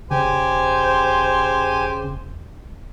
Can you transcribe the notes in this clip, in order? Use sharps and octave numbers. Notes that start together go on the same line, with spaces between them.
E1 C#3 G4 C5 G#5